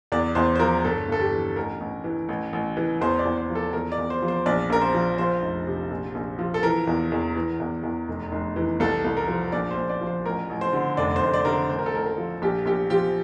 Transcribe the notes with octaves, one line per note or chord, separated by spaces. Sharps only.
E2 D5
E2 C5
C5
F3 A#4
G1 A4
G1 A4
G4
E3
A1 A#4
A1
E3
A1
A1
E3
E2 C5
D5
E2
C5
F3
A4
E2 A#4
D5
E2
C5
F3
C5
A#1 D5
A#1 A#4
C5
F3
F3 C5
F1
C3
A#1
A#1
F3
A4
E3 A#4
E2
E2
E3
E2
E2
F1
F1
E3
C2 A4
C2
A#4
F3
A#1 D5
C5
A#1
D5
F3
C5
A1 A#4
A1
C5
D3
F1 D5
C5
F1
D5
D3 A#4
C5
A1 C5
A#4
A4
A1 A#4
A#4
F3
A#1 G4
A#1 G4
F3 G4